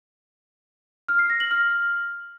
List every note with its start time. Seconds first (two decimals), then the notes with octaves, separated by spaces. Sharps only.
1.08 F6
1.19 C7
1.30 A#6
1.40 F#7
1.51 F6